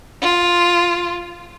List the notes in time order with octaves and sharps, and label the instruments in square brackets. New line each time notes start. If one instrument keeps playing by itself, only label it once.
[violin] F4